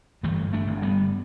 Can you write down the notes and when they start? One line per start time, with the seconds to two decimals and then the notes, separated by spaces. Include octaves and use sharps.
0.23 G1 E3 A3
0.53 A3 D4
0.67 G1
0.82 G3 B3